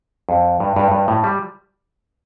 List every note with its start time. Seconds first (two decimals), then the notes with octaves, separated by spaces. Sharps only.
0.29 F2
0.60 G2
0.76 G2
0.92 G2
1.08 A2
1.24 G3